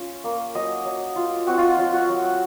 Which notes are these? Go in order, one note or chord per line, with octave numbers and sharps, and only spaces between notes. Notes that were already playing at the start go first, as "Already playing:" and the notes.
Already playing: C#4 F4 C#5
A#3
F#3 D#5
F#3
F4
C4 F#4
F4
F#3 F4
F#4
F#3